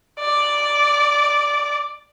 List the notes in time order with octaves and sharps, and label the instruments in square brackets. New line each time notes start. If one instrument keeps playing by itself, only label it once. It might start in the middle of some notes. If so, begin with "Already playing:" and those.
[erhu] D5